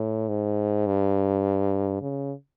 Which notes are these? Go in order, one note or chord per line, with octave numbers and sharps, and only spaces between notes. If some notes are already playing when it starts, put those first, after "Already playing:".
Already playing: A2
G#2
G2
C#3